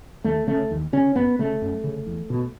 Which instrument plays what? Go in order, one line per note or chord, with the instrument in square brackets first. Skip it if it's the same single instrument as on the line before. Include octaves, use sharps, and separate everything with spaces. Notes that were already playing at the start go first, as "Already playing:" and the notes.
[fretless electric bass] D#2 A3
C#3 A3
D#2
C#3 C#4
F#2 B3
C#3 A3
F#2
C#3
E2
B2